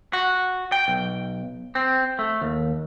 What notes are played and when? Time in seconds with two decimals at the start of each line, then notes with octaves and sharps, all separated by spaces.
0.13 F#4
0.72 G5
0.88 B1
1.75 C4
2.19 A3
2.41 D#2